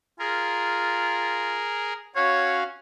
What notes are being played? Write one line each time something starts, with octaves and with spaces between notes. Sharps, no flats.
F4 G#4 A#4
C#4 F#4 C#5 F5